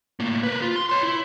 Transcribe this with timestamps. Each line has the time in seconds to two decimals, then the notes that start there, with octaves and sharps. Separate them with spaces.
0.20 A2 A#3
0.43 A#4 B4
0.62 F4
0.76 C6
0.89 C#5 C6
1.03 E4